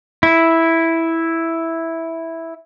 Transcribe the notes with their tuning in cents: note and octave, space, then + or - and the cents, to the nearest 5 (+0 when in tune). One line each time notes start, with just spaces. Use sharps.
E4 -5